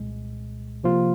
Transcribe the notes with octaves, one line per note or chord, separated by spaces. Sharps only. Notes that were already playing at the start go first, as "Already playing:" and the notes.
Already playing: C2 A#2 G#3
C3 F3 A#3 F4